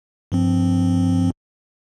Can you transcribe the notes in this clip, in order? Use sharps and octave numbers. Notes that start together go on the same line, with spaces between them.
G2 F3 C4